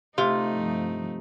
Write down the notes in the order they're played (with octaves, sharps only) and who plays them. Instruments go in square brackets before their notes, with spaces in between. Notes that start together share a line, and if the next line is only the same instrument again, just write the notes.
[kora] C3 [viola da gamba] A3 D#4 [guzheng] F4
[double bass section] G2 F3